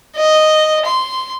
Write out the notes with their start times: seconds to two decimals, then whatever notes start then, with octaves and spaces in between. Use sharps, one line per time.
0.16 D#5
0.85 C6